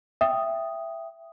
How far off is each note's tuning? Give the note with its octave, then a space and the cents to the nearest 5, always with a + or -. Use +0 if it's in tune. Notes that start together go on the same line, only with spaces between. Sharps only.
E5 +10 G5 +0 D#6 +0